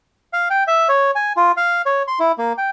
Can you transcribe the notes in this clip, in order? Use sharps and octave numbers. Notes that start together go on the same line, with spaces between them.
F5
G5
E5
C#5
G#5
F4
F5
C#5
C6
E4
A#3
G5